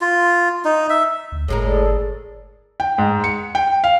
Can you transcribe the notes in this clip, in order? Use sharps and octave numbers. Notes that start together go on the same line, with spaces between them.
F4
D#4
E5
D2
G1 A2 G#3 A#4
G#4 A4 D5
G5
G#2
C#7
G5
F5